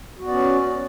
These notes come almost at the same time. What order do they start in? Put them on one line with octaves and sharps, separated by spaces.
F#4 B3 D5 C#4